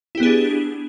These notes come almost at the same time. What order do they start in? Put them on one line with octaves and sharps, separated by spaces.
E4 G4 B3 G#4 D4